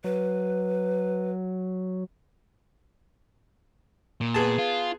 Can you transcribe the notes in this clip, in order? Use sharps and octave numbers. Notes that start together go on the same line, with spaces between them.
F#3 B4
A#2
B3 G#4 A5
F4